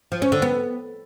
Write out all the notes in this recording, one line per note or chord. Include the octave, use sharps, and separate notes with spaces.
F3
C#4
D3
B3